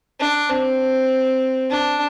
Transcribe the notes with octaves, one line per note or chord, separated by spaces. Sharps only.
D4
C4
D4